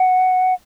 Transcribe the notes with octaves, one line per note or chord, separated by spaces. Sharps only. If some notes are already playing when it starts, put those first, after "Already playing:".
Already playing: F#5